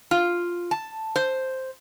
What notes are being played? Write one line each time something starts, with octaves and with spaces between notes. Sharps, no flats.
F4
A5
C5